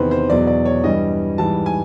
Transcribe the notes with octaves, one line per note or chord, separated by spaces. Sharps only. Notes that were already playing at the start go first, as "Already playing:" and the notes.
Already playing: E2 C3 D#3 B4 C5
C5
E2 B2 F#3 D5
D5
C#5
G2 E3 G3 D#5
G#2 E3 G3 A5
G#5